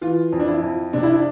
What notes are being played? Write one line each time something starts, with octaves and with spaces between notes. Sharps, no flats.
E3 F4
F2
D4
E4
F2
C3 D4
E4
D4